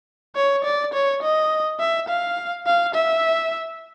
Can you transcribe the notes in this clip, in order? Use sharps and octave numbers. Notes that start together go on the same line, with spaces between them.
C#5
D5
C#5
D#5
E5
F5
F5
E5